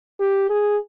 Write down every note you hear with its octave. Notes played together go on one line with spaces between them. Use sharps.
G4
G#4